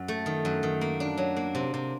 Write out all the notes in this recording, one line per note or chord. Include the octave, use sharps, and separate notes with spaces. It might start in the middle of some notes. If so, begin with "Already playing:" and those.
Already playing: F#2
A3
D#3
F#2
D#3
A#3
D4
F#3
A#3
C3
C3